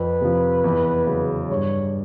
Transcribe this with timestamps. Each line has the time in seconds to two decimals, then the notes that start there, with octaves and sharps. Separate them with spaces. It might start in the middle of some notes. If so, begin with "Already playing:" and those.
Already playing: F2 B4
0.21 C3 F3
0.64 E2
1.07 C#3 F#3
1.50 G2 C#5